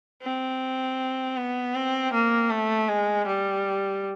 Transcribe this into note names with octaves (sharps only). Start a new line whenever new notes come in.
C4
B3
C4
A#3
A3
G#3
G3